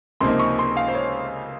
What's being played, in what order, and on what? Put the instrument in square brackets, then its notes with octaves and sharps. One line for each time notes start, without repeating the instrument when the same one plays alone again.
[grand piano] C#2 C3 F3 A#3 D#4 C6
C#6
C6
F5
C5
C#5